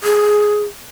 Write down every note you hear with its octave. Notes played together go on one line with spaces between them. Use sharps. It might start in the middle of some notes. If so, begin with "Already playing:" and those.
G#4